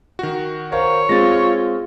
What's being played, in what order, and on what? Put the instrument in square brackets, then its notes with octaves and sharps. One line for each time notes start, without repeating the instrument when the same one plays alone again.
[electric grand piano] D#3 F#4
[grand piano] A#4 C5 F5 [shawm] C#5
[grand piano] G#3 C4 [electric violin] F4 [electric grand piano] A6 A#6